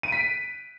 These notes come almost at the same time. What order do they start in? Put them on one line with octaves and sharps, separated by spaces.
D#7 D7 B6